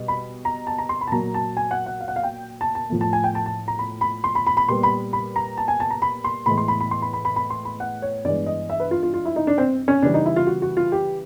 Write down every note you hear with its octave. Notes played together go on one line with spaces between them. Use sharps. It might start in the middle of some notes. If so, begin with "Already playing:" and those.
Already playing: B2 G3
B5
A#5
A5
A#5
C6
B5
A5
A#2 F#3 A#3 A#5
A5
G#5
F#5
F#5
F5
F#5
F5
G5
A5
A5
A2 F3 A3
A5
G#5
G5
A5
A5
A#5
B5
B5
C6
B5
B5
B5
A#2 G3 B3 C6
B5
B5
A#5
A5
G#5
A5
A#5
B5
C6
A2 E3 G#3 B3 B5
C6
B5
B5
C6
B5
B5
B5
B5
C6
B5
F#5
C#5
G2 E3 G#3 B3 D5
D#5
E5
B4
F4
F4
F4
E4
D#4
D4
C4
C#4
C#3 E3 G3 D4
D#4
E4
F4
F#4
F#4
F4
G4